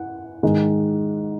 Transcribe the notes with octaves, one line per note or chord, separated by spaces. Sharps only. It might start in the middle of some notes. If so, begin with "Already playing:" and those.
Already playing: F#5
G#2 D#3 G#3